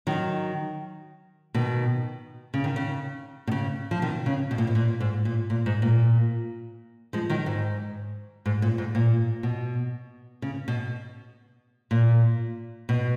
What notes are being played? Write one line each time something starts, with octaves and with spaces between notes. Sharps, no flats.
D#3 F#3
B2 D#3
C#3
D#3
C#3
B2
C#3
F3
B2 D#3
C#3
B2
A#2
B2
A#2
G#2
A#2
A#2
G#2
A#2
F3 G#3
D#3 F#3
G#2
G#2
A#2
G#2
A#2
B2
C#3
B2
A#2
B2